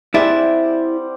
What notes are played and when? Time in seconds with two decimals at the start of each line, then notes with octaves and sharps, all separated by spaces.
0.14 G3 C4 E4 G#4 D5 E5 F#5